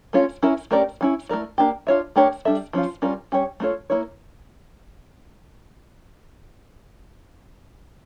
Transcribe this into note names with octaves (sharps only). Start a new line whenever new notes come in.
A3 C#4 F4 C#5
C#4 E4 A#4 E5
A3 C#4 G4 A#4 D5
G3 C#4 E4
A3 E4 A#4 D5
A#3 D4 G4
D4 F4 C#5 E5
A3 D4 G4 A#4 C#5
G3 D4 A4 E5
F3 C#4 F4
G3 C#4 F4 A#4 D5
G3 C#4 G4 C#5
A3 D4 F4 A4 C#5
A#3 E4 A#4 C#5